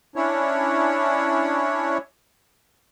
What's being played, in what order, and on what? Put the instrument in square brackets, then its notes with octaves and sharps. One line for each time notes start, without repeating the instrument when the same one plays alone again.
[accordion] C#4 D4 E4 C#5